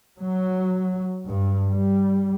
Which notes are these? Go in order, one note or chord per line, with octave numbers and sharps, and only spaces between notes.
F#3
G2
G3